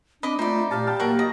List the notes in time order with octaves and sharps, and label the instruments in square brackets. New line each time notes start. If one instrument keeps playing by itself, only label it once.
[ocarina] C4 [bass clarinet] D4 [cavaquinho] D#5 D6 [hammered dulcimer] B5
[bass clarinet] A3 [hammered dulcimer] D#4 [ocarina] F4 [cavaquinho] C5 D5
[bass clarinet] A#2 [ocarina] G4 [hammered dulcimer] F5 A5
[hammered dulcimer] F5 G5 A5
[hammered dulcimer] F#3 [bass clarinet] A#3 [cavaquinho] A#4 F#5
[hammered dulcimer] D#5 [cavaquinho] A#5